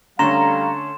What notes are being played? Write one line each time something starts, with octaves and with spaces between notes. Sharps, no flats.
D3 G3 A3 C#4 F5 A#5 C6 E7